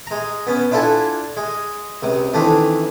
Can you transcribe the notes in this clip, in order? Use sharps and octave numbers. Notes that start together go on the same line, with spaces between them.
G#3 A#5
B3 C#4
D4 E4 F4 A4 F#5 G#5
G#3
C#2 C3
D#3 E3 A3 C4 D4